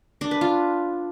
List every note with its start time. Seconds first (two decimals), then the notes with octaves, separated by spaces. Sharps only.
0.21 D4
0.31 B4
0.41 F4